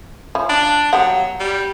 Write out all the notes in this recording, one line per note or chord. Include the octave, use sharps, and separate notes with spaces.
F3 C#4 E4
D4
F#3 B3 G4 F#5
G3